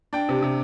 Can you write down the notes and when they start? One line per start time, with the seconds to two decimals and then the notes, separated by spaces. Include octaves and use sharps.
0.13 D4 G5
0.29 C3
0.42 C3